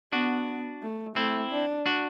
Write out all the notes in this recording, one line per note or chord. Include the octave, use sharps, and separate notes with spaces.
B3 D4 F#4
A3
A3 C4 E4
D4
D4 F#4